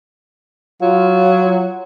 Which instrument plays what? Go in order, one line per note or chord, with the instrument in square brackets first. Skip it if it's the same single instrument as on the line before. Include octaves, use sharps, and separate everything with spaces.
[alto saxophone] F#3 [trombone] F4